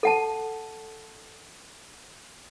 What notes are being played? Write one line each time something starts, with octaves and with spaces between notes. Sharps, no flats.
A4 F#5 A5